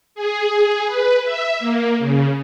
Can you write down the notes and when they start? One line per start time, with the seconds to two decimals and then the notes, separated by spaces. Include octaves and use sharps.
0.15 G#4
0.86 B4
1.23 E5
1.59 A#3
1.99 C#3